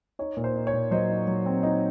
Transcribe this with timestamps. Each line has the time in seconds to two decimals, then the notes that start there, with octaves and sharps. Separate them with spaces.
0.19 D#4 C#5
0.37 A#2
0.44 C5
0.56 D#4
0.67 C#5
0.74 A#2
0.91 F#3 C5 D#5
1.10 D#4
1.27 F#3
1.46 C4
1.63 D#4